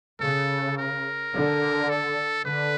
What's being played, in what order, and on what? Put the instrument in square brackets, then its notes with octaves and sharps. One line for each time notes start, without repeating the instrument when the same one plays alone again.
[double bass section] C#3 [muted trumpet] A4
[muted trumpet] A#4
[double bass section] D3
[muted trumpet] A4
[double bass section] D3 [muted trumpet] B4